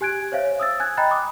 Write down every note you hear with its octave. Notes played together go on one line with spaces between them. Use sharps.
G4 G#5 F#6 G#6 D7
C5 C#5 E5 F5
D#6 E6 A6
G#5 F#6 G#6
D#5 G5 A#5 B5 F#6 A6
D6 D#6 F#6